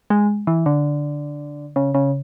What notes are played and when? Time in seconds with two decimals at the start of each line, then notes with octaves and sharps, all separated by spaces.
0.10 G#3
0.47 E3
0.66 D3
1.76 C#3
1.94 C#3